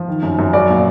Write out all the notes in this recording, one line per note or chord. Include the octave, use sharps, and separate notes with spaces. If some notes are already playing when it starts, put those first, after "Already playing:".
Already playing: F3
D#3
F#2
F#2
F#3 D5
A#2